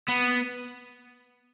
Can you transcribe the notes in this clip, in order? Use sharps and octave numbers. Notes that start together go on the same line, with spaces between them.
B3